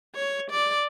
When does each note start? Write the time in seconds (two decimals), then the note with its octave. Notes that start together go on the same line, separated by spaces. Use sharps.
0.15 C#5
0.51 D5